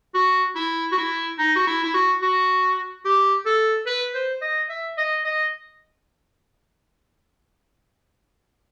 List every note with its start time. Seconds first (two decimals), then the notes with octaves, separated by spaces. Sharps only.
0.15 F#4
0.56 E4
0.92 F#4
0.98 E4
1.38 D#4
1.56 F#4
1.67 E4
1.83 E4
1.94 F#4
2.22 F#4
3.05 G4
3.46 A4
3.87 B4
4.14 C5
4.42 D#5
4.69 E5
4.98 D#5
5.25 D#5